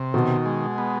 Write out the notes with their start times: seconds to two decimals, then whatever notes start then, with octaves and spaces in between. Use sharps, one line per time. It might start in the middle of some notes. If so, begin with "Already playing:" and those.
Already playing: C3
0.14 B2 D#3
0.46 G#3
0.78 B3